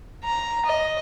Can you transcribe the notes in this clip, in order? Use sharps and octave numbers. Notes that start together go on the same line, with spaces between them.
A#5
D#5